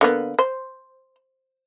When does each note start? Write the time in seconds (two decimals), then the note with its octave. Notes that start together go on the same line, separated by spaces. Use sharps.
0.01 D3 A#3 B3
0.39 C5